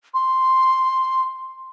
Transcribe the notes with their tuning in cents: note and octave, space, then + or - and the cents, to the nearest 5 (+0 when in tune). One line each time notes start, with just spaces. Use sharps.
C6 +0